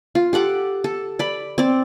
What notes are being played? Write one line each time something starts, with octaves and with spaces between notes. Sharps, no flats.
F4
G4 A4 F#5 D6
A4
D5 B5
C4 D5